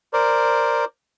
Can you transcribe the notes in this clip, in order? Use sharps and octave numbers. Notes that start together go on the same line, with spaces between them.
A#4 C5 D5